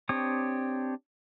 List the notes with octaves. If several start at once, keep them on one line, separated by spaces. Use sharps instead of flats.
C4 D4 G4 C#5 D#6